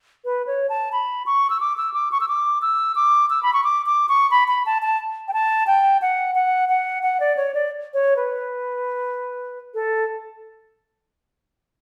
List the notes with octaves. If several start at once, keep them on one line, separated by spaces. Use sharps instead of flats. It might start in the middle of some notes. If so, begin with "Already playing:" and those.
B4
C#5
A5
B5
C#6
E6
D6
E6
D6
C#6
E6
D6
E6
D6
E6
B5
C#6
D6
D6
C#6
B5
B5
A5
A5
G5
A5
G5
F#5
F#5
F#5
F#5
D5
C#5
D5
C#5
B4
A4